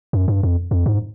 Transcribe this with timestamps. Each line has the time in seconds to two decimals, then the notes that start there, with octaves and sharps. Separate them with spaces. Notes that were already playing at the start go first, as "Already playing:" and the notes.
0.13 F#2
0.28 G2
0.43 F2
0.71 F2
0.86 G#2